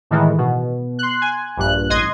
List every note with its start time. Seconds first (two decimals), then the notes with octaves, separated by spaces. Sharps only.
0.11 A2 D#3 E3 G#3
0.38 B2
0.99 C6 F#6
1.22 G#5
1.57 A#1 G2 F#6
1.90 A1 D#5 C6 G#6